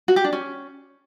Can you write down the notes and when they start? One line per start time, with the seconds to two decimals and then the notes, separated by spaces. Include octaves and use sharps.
0.08 F#4
0.16 G4
0.24 D4
0.33 C#4